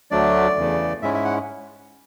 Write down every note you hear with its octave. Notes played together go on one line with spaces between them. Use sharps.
D2 D3 F#3 A3 D4 D5
E2 C#3 E3 A3
G#2 G#3 C#4 E4 E5
E5
F#5